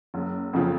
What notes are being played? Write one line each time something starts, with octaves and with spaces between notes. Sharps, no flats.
F#1
F2 C#3 F3